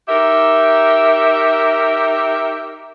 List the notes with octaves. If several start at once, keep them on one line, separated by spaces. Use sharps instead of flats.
D#4 G4 A#4 E5